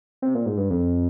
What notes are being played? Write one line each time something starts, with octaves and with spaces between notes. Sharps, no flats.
C3
A#2
G#2
G2
F2